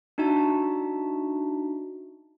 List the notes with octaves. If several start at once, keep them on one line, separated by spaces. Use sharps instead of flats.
D4 D#4 F#4 E5 A5